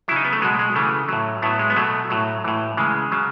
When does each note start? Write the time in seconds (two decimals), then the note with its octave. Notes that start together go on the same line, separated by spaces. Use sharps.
0.08 F#3 E4
0.11 C#3 D#4
0.25 B3
0.33 A3
0.42 B2 F#3 G#3
0.59 G#3
0.75 C#3 E3 A3
1.09 A2 F#3
1.42 A2 F#3 B3
1.59 G#3
1.70 B3
1.76 B2 F#3 A3
2.10 A2 F#3
2.44 A2 E3
2.77 C#3 E3 G#3
3.12 C#3 F#3